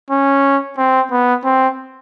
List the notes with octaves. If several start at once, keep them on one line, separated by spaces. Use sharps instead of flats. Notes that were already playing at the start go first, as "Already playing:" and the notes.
C#4
C4
B3
C4